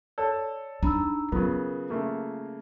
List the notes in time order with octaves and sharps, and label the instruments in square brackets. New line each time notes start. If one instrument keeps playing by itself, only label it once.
[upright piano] A4 [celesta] C#5 D5
[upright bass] D4 D#4 [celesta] A#5 B5 E6
[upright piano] C#3 B3 [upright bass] F#3 [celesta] F4 A#4
[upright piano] C#3 A3 A#3